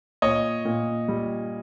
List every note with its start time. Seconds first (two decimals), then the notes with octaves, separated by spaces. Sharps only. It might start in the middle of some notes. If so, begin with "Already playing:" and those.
0.22 A#2 C#5 D#5
0.65 A#2
1.08 G3